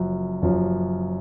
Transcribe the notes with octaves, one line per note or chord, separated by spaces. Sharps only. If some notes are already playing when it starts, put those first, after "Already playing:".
Already playing: F#1 F#2 F3
F#1 F#2 F3